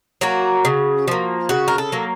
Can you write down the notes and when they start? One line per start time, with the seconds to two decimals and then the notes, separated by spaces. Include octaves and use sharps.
0.21 F#3 A#3 F#4
0.65 C#3
1.08 F3 A#3
1.49 C#3 F#4
1.68 A#4
1.78 A4
1.92 F#3 A#3